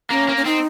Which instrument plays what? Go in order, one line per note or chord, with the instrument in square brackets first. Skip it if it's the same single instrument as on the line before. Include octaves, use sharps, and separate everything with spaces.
[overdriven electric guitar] A#3 [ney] C#4
[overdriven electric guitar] A#3
[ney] C#4
[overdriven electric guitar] C4 [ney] D#4